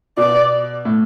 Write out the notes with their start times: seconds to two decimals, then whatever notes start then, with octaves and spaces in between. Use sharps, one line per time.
0.17 B2 D5
0.85 A2